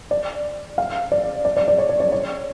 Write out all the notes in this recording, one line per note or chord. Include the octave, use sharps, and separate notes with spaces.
D5
F5
D5
D5
D5
D5
C#5
D5
D5
C#5